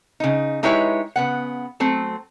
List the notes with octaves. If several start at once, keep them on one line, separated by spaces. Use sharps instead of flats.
C#3 D#4
G#3 D#4 E4 G4 B4 C#5
C#3 B3 F#5
F#3 A3 C4